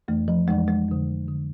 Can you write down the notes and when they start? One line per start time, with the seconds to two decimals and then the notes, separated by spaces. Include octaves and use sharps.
0.08 F2 E3 A3
0.28 F3
0.48 F2 E3 G#3
0.68 G#3
0.88 F2 D3
1.28 D3